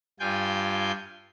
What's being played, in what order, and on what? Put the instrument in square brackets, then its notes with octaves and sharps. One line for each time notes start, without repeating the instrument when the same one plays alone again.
[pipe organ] G2 F4 G5 G#5 G6